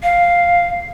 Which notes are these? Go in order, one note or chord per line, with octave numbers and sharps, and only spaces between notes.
F5